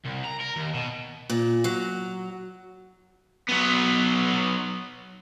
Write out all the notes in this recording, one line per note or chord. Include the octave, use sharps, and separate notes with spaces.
C2
A#5
A#4
D#2
B2
A#2
F#3
F#3 B3